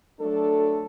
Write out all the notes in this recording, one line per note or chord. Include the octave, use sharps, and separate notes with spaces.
F#3 A3 D4 A4